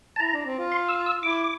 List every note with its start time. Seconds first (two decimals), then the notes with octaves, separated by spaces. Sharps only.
0.16 A5
0.20 E4 A#5
0.34 D4
0.46 C4
0.59 F4
0.72 C6
0.88 E6
1.06 E6
1.23 E4 D6